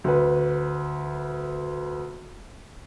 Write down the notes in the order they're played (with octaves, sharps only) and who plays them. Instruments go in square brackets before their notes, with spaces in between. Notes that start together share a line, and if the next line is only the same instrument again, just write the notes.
[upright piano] D2 B4